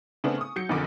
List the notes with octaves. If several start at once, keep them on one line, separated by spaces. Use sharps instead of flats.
C#3 A3 B3 C4 D4
C#6 D#6
F#3 G6 C#7
F#1 B1 F2 D3 A#4 D6